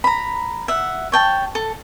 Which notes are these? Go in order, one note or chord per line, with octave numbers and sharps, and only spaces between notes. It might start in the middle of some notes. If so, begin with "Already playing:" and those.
A#5 B5
E5 F#5
C#5 G5 A5
A4